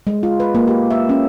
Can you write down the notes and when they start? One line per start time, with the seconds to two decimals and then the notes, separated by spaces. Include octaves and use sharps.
0.07 G#3
0.23 F4
0.40 B4
0.55 A#3
0.68 G4
0.90 E5
1.09 C#4